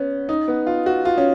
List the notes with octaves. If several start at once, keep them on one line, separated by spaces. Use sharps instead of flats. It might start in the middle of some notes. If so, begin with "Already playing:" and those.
Already playing: B3 C#4
D#4
B3
F4
F#4
F4
C#4